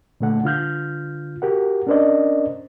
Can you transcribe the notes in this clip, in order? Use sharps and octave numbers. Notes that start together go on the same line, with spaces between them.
A#2 D3 A3 A4 F#5
D3 F4 F6 G6
F#4 G4 A#4 F#5
C#4 D4 A#4 C5 D5 D#5